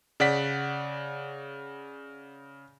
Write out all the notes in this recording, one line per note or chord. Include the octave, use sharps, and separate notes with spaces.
C#3 D5 F#5 B6